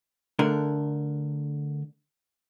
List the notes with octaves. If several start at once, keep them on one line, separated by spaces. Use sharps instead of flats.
D3 A3 D4 A#4